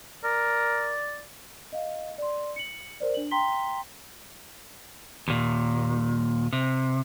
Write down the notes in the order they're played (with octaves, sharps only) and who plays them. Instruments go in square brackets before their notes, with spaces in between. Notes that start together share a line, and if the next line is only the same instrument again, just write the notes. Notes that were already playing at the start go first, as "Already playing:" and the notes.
[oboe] A#4 [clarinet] D5
[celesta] D#5 F5
D5 C6
C#7 F#7
A#4 C5 D5
D4 F#7
G5 A#5 C6 B6 G7
[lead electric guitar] D#2 A#2
C3